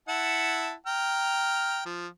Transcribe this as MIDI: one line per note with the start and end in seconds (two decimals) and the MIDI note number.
0.08 0.73 64
0.08 0.73 78
0.08 0.73 81
0.86 1.83 79
0.86 1.83 82
0.86 1.83 89
1.85 2.07 53